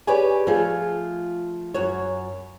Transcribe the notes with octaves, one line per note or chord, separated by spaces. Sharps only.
G4 G#4 B4 C#5 D5 G#5
F3 A3 F4 G#4
F#2 F#4 C#5